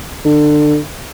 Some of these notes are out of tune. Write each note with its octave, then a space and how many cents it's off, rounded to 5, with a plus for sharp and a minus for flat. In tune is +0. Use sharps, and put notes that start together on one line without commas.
D3 +25